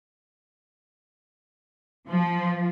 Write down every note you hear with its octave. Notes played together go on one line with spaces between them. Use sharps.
F3